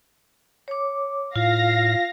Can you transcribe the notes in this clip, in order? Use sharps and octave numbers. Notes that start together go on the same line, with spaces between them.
C#5 D6
A2 F4 F5 A#6